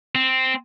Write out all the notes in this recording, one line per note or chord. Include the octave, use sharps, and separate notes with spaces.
C4